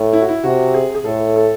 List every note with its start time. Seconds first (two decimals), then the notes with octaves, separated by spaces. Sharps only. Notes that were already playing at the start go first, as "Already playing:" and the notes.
Already playing: A2
0.13 E4
0.21 F#4
0.28 E4
0.44 C3 F#4
0.74 G#4
0.95 G#4
1.05 A2 A4
1.36 A4